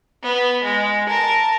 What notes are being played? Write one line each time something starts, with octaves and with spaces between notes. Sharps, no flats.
B3
G#3
A#4 A5